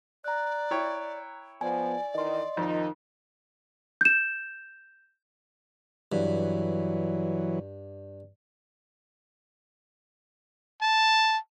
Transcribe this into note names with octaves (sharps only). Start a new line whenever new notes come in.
D5 A#5 F#6
E4 C#5 G5
F3 B3 D5 G#5
D#3 E3 D#5 C6
F2 D#3 F3 D#4
G6 E7
G2 E3 F#3
A5